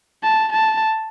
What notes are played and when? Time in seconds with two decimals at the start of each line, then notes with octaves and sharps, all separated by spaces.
0.23 A5
0.52 A5